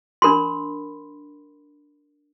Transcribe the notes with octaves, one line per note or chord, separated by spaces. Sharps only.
D4 A#4 B5 C6